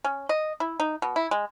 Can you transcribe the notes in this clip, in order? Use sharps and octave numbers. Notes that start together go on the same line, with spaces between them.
C#4
D#5
E4
D#4
B2
E4
G#3